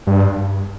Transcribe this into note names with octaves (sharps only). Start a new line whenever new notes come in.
G2